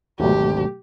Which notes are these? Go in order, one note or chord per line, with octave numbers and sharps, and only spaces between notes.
G#1 D2 B2 F#3 A3 G4